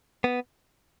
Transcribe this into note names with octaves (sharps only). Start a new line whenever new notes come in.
B3